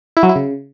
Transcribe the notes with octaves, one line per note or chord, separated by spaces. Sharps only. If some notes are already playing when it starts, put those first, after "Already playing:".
E4
F#3
E4
C#3